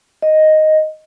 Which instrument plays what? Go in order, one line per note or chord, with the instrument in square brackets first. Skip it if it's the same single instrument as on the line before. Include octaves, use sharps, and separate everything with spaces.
[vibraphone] D#5